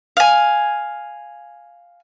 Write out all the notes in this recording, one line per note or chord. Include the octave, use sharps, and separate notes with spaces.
F5 G#5